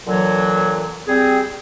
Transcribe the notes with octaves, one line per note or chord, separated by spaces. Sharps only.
A#2 D3 E3 F#3
G3 C4 G#4